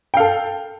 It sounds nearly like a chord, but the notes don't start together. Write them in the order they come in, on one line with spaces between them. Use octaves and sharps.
G5 F5 A4